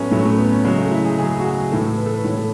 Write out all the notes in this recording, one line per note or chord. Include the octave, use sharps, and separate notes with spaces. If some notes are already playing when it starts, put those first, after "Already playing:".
Already playing: A2 F#3 A3 B3 C#4
A2 F#3 A3
A3
B3
C#4
C#3 F#3 G#3
A3
E4
G#4
C#3 F#3 G#4
F#4
G#4
A2 E3 A4
B4
A4
B4
A2 E3 C#5
A4